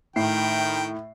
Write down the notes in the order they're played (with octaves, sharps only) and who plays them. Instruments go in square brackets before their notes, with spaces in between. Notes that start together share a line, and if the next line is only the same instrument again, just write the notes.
[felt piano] A2 C7 [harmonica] D#3 G5